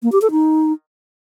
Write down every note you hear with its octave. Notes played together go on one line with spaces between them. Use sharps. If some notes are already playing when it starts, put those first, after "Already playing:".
A#3
G4
A4
D#4